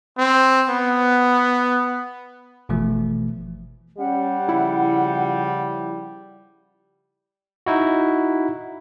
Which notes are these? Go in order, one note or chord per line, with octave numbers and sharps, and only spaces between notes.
C4
B3
G1 B2 E3 F3 A3
G3 C#4 G4 F#5
C#3 F3 E4
D#4 E4 F#4